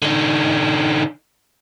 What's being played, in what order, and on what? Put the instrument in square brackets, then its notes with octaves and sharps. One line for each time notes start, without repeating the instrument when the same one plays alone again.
[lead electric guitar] D3 D#4